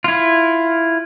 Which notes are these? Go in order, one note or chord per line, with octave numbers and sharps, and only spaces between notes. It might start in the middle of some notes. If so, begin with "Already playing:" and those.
E4 F4